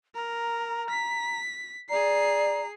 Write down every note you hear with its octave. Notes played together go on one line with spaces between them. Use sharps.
A#4 A#5
B6
G#4 D5 A#5 C7